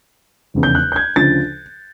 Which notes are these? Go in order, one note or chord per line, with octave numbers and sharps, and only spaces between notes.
F1 E2 C#3
G6
F#6
G6
G#6
D2 C#3 F3 A6